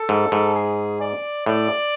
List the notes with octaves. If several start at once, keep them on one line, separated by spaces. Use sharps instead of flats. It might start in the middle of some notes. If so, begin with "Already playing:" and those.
Already playing: A4
G#2
G#2
G#4
D5
A2 D5